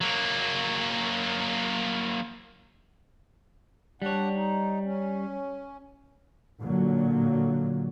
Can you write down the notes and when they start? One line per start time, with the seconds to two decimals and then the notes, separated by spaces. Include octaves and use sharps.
0.01 F#3 A#3
4.02 G3 D4 C#5 F#5
4.35 D#4
4.84 C#4
6.61 A#2 D3 F#3